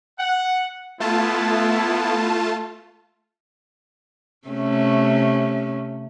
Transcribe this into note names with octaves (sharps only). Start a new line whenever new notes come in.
F#5
A3 B3 E4 F4 A5
C3 A3 C#4